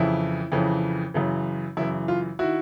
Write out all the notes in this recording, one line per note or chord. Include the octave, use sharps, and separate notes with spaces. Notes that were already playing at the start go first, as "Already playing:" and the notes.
Already playing: F2 C#3 E3 E4
F2 C#3 E3
F#2 C#3 E3
F#2 C#3 E3 E4
F4
D#3 E4 F#4